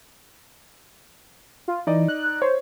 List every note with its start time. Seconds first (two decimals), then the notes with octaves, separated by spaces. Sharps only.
1.68 F4
1.87 E3 D#4 D5 D#5
2.08 F#6
2.42 C5 C#5